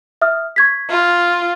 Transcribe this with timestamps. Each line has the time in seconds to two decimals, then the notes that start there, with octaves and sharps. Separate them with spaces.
0.22 E5 D#6 F6
0.56 C#6 G#6 B6
0.89 F4